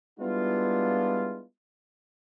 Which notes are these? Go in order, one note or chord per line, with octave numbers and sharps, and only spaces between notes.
G3 G#3 B3 D4 E4 F4